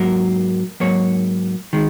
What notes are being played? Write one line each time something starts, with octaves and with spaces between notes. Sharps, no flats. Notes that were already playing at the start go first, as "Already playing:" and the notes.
Already playing: G#2 F#3 A#3 A#4
G#2 F#3 A#3 C#5
D#3 G#3